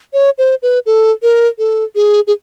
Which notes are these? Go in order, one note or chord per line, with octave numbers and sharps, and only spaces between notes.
C#5
C5
B4
A4
A#4
A4
G#4
G#4